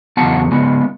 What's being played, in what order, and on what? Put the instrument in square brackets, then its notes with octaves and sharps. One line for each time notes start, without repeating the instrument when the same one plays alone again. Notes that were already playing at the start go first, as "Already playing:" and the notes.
[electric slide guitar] E2 C#3 F#3 B3 F#5 A5
C#3 G#3 B3